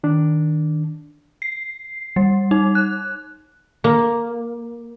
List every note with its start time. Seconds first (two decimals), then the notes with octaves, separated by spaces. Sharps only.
0.04 D#3 D4
1.42 C7
2.16 G3
2.51 D#4
2.75 F#6
3.84 A#3